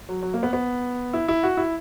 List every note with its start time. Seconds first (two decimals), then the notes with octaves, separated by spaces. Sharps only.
0.09 F#3
0.23 F#3
0.34 A#3
0.43 B3
0.53 B3
1.13 E4
1.28 E4
1.43 F#4
1.57 E4